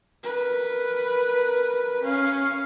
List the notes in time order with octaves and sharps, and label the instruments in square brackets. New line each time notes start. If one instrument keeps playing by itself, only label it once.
[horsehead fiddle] A#4 B4
C#4 F5